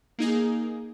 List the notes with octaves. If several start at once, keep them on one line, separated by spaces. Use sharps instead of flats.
A#3 D#4 G#4